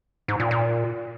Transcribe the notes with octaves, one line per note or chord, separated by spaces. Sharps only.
G#2
A#2
A#2